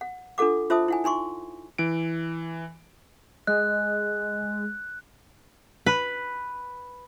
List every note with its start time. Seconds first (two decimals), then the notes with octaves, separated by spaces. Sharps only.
0.01 F#5
0.38 D4 F4 A4 F#5 D6
0.70 F4 C5 E5 A5 D#6
0.88 E4 F#5 G#5
1.04 D#4 G#5 C6 C#6
1.78 E3 D7
3.47 G#3 D#5 F#6
5.86 B4